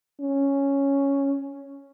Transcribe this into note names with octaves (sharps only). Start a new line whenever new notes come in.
C#4